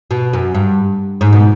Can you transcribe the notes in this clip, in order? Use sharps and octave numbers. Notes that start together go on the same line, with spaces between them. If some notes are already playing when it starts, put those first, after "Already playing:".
B2
F#2
G2
G#2
B2